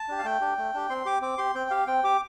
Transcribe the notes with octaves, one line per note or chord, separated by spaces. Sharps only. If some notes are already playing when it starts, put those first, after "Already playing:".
Already playing: A5
D4 G4
F5
A3 G5
D4 G4
A3
D4 G4
C4 C6
G4 D6
C4 D6
G4 C6
C4 G5
G4 F5
C4 G5
G4 D6